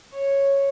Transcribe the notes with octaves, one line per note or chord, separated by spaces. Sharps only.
C#5